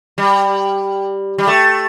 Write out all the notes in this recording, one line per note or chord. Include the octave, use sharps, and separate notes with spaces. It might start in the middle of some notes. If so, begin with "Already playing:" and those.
G3
G3
A3